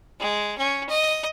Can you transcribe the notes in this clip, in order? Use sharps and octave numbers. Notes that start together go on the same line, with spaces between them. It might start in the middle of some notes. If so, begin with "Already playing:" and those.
G#3
C#4
D#5